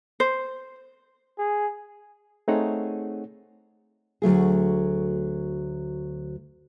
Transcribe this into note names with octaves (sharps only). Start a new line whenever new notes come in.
C5
G#4
A3 C4 D#4 G#4 C#5 F#5
D2 F#3 A3 G#4